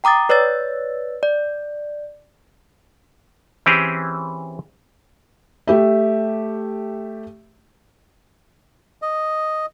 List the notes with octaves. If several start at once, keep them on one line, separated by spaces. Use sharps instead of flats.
G5 A#5 D6 D#6 A6
B4 C#5 D5 E6 A6
D5
E3 C4 C#4 G4 G#4
A3 G4 E5
D#5